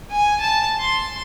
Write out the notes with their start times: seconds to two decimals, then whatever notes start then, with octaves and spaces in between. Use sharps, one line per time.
0.11 G#5
0.40 A5
0.80 C6